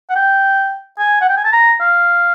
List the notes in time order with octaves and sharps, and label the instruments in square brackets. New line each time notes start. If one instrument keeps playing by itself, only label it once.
[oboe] F#5
G5
G#5
F#5
G5
G#5
A5
A#5
F5